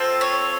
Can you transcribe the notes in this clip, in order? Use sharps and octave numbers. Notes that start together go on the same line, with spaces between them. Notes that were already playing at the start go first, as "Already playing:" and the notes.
Already playing: C4 F4 A4
C#5